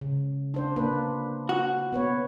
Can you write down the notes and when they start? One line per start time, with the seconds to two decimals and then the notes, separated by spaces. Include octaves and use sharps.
0.01 C#3
0.54 D4 C5
0.76 A#3 D4 B4
1.49 F#4
1.92 B3 B4 C#5